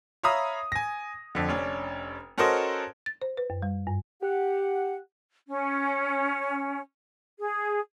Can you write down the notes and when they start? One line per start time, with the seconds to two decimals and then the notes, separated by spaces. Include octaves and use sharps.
0.23 C#5 E5 F5 A#5 B5 D#6
0.72 G#5 A#6
1.35 F2 D3
1.49 F1 C#4 D4
2.38 C#4 F#4 A4 A#4 C5 D#5
3.06 A6
3.22 C5
3.37 B4
3.50 F#2
3.62 G3
3.87 G2
4.22 G4 F#5
5.48 C#4
7.38 G#4